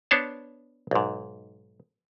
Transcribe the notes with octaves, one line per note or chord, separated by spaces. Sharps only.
B3 D4 C5 C#5 A5
B1 G#2